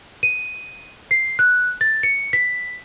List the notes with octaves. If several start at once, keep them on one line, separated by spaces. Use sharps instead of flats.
D#7
C7
F#6
A6
C#7
B6